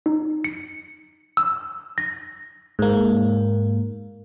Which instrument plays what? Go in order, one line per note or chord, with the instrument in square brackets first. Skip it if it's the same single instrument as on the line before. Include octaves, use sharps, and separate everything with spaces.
[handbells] D#4
C#7
E6
A#6
[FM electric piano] G#2 A#3